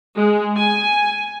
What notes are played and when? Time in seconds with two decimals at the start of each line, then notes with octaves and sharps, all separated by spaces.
0.17 G#3
0.57 G#5